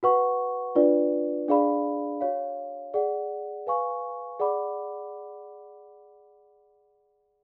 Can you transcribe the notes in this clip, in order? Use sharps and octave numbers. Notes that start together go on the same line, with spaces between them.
F#4 B4 F#5 C#6
D4 F4 B4 D5
D4 G#4 D5 F5 B5
F#4 C#5 F5
G#4 D5 F#5
B4 F5 G#5 C#6
G#4 D5 F#5 B5 D6